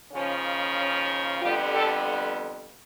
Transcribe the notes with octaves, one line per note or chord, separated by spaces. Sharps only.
D#2 C#3 F3 C#4
C#4
F2 D3 G3 B3 F4 G4
G4 A4